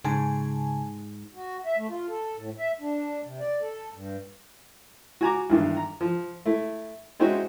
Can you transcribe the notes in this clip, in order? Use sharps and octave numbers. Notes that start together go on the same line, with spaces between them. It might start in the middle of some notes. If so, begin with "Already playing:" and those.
G#2 C#3 G#5 A5
F#4
E5
A3
F4
A4
A2
E5
D4
C3
D5
A4
G2
F#4 G#5 A#5 D6
E2 G2 D#3
A#5
F3
A3 E4
G#3 C4 C#4 D#4 E4 F#4